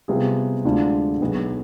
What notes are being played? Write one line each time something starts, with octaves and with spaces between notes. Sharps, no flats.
C3 G3 B3 F4 G#4
D2 D3 G#3 D4 F4
B1 B2 B3 D#4 G#4